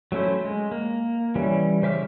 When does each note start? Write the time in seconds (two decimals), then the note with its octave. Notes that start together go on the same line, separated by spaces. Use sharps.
0.12 F#3 A3 C#4 E4 C5
0.44 G#3
0.71 A#3
1.35 E3 G3 C#4
1.82 C#3 C5 E5 D6 F6